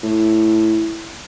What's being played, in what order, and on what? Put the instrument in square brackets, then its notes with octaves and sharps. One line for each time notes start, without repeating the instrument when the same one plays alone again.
[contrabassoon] A2